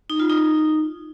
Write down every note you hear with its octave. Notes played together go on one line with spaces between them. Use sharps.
D#4
F4
D#4